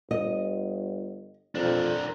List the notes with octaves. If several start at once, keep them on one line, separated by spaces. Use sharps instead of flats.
G1 D#5
F2 D4 A#4